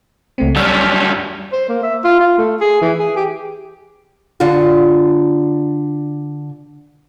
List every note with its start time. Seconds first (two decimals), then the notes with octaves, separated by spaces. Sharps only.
0.38 C#2 A3 C4
0.56 F#2 G3 E6 F6
1.52 C5
1.69 A#3
1.83 E5
2.04 F4
2.20 F4
2.38 A3
2.60 G#4
2.81 E3
2.99 G#4
3.16 G4
4.40 D3 D4 F4 F#4